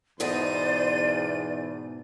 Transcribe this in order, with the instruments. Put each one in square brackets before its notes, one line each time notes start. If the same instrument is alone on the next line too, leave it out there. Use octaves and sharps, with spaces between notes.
[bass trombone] E2 [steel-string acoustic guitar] G#2 B2 D#4 [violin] C5 D#7 [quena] D5